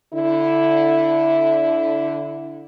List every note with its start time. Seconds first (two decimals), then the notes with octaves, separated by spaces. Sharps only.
0.14 D3 E4